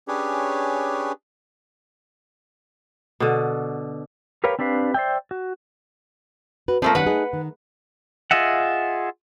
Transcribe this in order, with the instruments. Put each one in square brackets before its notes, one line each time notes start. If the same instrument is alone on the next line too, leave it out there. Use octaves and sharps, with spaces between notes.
[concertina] C#4 D4 G4 G#4 B4 C#5
[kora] B2 D3
[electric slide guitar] G4 A#4 B4 C#5 F5 G5
C4 D4 G4 B4 F5
C5 D5 E5 G5
F#4
[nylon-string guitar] F#4 B4
[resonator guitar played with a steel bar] F3 A3 A#3 [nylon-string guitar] C4 A#4
[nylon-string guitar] D#3 G3 C#4 [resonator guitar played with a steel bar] B4 F#5
[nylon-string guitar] A3 D#4 G#4
D#3
[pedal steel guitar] F4 G#4 D#5 E5 F#5